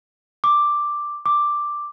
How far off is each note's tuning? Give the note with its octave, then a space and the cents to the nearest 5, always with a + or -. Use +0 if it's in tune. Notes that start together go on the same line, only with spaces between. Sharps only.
D6 +5
D6 +5